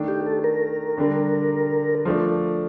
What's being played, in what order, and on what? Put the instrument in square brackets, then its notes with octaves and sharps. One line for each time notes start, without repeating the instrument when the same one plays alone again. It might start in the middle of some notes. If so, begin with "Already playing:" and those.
Already playing: [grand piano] D#3 A3 D4
[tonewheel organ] G4
A4
A#4
[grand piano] D3 G3 D4
F3 A3 D4